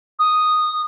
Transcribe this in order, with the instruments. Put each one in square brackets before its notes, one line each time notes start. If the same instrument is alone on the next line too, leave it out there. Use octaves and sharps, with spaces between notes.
[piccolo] D#6